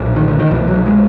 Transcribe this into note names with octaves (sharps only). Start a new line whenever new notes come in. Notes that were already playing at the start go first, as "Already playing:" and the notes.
Already playing: B1 A#2
D#3
D3
D#3
C2 B2 E3
F#3
G#3